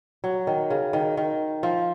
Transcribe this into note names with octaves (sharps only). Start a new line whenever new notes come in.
F#3
D#3
C#3
D#3
D#3
F3